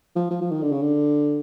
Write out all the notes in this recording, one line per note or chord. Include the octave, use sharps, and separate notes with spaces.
F3
F3
F3
D#3
D3
C#3
D3